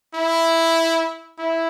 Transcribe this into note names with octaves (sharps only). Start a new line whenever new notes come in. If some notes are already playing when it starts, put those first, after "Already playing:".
E4
E4